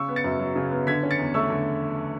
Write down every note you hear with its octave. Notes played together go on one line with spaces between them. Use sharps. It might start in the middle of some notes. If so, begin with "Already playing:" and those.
Already playing: C#3 C#6 E6
B3
A6 C#7
F#2
F#3
C#3
B3
D3 G#6 B6
C#4
A6 C#7
E2
A3 C#6 E6
D3